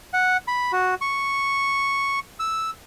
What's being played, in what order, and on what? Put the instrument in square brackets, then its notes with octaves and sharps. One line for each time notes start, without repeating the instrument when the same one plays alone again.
[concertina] F#5
B5
F#4
C#6
E6